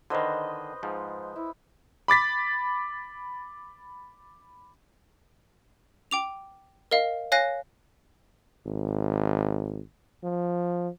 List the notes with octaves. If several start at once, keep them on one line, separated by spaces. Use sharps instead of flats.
D3 D#3 B4 C5 D#5
G#2 F3
E4
B5 D6 A6 B6
G5 D6 F7
A#4 D#5 F5
C#5 F5 G#5 F#6 A#6
G#1
F3